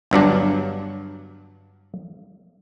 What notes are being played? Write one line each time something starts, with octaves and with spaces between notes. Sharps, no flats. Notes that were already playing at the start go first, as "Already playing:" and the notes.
G1 G2 F#3 D4